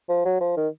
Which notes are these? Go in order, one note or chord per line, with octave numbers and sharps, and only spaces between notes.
F3
F#3
F3
D#3